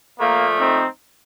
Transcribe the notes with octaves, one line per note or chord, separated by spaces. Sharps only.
A#2 F3 A3 A#3
C4 D#4